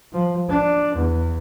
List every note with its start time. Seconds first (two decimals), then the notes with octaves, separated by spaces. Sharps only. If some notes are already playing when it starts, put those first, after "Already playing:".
0.13 F3
0.49 D4
0.95 E2